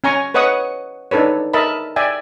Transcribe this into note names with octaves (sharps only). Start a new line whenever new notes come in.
C#4 G#5 A#5 C#6
B4 C#5 D#5 F#5 C#6 D#6
D4 D#4 A4 B4 C#5
A#4 D#5 E5 A5 B5
D5 E5 G5 G#5